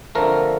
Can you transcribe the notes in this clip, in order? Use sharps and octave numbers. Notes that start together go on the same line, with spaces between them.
F2 D3 F3 A3 A#4